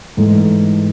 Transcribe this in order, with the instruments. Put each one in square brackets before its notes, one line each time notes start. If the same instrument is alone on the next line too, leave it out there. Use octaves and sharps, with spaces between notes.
[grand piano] G#2 E3 A3